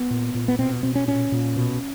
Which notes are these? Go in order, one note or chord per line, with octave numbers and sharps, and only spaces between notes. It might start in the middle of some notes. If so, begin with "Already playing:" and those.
Already playing: B3
A#2
A#2
B3
B2 C4
B2 C4
C#4
A#2 C#4
A#2
B2